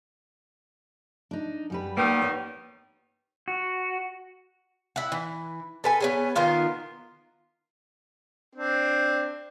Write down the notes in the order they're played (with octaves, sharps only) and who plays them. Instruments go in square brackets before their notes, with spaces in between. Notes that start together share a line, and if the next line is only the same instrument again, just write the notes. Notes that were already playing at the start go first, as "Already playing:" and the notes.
[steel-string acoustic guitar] D4 D#4
F#2 G3 B4
[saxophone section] D#3 G3 B3 [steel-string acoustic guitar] A#3 G5
[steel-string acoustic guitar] D#4 C#5
[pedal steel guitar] F#4
[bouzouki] E4 F#5
E3
A4 B4 G#5
B3 C#4 G#4
D#3 B3 F4 A#4
[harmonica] C4 D4